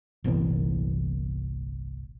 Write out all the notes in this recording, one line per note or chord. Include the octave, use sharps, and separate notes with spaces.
G1 C2 A#2 E3